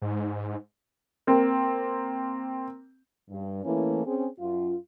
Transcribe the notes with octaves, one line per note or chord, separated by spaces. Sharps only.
G#2
A#3 C4
G2
E3 A3 A#3 C#4 E4
C4 C#4 G#4
F#2 F4